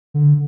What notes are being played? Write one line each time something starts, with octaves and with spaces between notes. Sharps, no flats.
D3